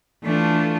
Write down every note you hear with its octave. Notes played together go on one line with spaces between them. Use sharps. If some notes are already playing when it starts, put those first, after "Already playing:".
E3 A3 D4 F4